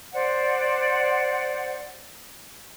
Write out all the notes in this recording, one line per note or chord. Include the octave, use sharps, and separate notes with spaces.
C5 D5 F#5